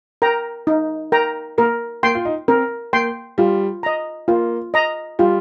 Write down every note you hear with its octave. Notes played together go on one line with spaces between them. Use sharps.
A#4 G5 A#5
D#4
A#4 G5 A#5
A#3 A#4
A#3 G5 C6
F4
D#4
C4 A#4
A#3 G5 C6
G3 F4
D#5 A#5
A#3 F4
D#5 A#5
G3 F4